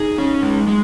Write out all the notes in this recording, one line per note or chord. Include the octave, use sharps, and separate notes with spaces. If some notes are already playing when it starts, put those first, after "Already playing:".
Already playing: D#4 G#4
C#4
G#3
G#3